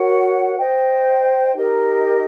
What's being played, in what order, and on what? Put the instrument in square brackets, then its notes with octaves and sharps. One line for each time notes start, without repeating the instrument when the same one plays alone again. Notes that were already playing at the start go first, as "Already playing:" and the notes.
Already playing: [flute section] F#4 A#4 C#5 F#5
C5 D#5 G5
D#4 G4 A#4 D#5